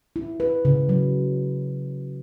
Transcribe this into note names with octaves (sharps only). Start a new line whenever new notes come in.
E4
B4
C#3
F#3